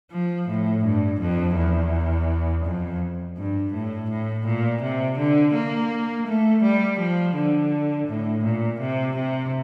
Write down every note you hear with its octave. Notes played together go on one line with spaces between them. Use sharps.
F3
A2
G2
F2
E2
F2
G2
A2
A2
A#2
C3
D3
A#3
A3
G3
F3
D3
A2
A#2
C3
C3